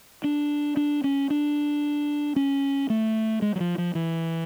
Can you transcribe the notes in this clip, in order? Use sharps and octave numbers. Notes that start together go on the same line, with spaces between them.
D4
D4
C#4
D4
C#4
A3
G#3
F#3
F3
F3
E3